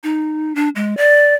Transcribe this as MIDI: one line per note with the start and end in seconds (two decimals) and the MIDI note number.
0.03 0.55 63
0.55 0.69 62
0.76 0.97 56
0.97 1.35 74